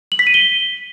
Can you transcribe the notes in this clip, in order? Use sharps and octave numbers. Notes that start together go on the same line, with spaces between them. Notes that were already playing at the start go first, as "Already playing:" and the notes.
F#7
B6
D#7
G7